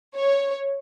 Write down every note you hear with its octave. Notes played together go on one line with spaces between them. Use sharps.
C#5